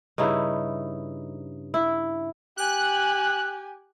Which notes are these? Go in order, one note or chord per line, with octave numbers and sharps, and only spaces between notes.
G2 C#3 D#4 E4
E4
G4 G#5 F#6